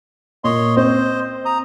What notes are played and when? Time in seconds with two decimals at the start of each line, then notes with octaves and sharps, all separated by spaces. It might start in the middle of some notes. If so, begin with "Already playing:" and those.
0.44 A#2 C#5 D#5 C6
0.77 C4 C5 D#5
1.45 A#5 D#6